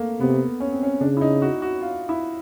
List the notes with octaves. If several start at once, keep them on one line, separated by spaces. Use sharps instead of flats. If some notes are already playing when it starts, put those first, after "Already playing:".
Already playing: A3 A#3
C3 B3
C#4
C4
C#4
C#3 D4
E4
D#4
F#4
F#4
F4
E4